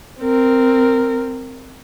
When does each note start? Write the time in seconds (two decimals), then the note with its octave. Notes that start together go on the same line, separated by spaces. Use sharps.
0.21 C4 A#4